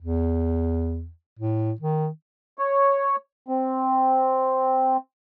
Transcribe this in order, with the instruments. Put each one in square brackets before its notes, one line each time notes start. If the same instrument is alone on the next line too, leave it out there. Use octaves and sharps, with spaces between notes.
[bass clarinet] E2
A2
D#3
[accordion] C#5
C4